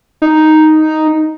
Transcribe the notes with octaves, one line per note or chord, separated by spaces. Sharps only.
D#4